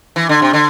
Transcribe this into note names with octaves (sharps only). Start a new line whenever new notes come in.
E3
D3
C3
D3